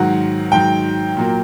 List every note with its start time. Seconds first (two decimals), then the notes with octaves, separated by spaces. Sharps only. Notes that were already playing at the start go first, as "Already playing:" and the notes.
Already playing: G#2 D#3 F#3 F#5
0.52 G#2 D#3 F#3 G5
1.17 A#2 F#3 A#3